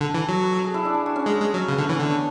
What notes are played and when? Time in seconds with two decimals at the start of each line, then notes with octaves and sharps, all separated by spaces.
0.01 D3 A4
0.14 E3
0.29 F#3
0.43 B4
0.52 A4
0.64 G#4
0.74 E4
0.85 D4
0.94 E4
1.06 F#4
1.16 C#4
1.26 G#3
1.40 G#3
1.54 F#3
1.68 C#3 B3
1.78 D3 A3
1.89 E3 C#4
1.99 D3 D4
2.11 B3